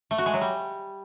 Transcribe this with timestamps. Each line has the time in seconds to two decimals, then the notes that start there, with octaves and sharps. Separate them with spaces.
0.11 A3
0.18 F#4
0.26 G#3
0.34 F#3
0.41 G3